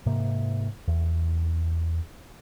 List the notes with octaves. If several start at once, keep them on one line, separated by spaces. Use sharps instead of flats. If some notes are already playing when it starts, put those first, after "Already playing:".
G#2 C3 A#3
E2